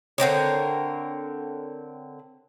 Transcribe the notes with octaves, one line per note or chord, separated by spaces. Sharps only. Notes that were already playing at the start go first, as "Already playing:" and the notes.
D3 C4 A#4 C#5